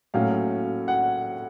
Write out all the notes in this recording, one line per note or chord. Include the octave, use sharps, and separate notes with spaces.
A2 F#3 A#3 C#4 F5
F#5